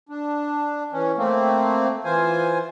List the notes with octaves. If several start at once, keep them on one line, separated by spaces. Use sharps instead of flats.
D4
E3 C#4
A3 A#3 C4
E3 F4 C5 G#5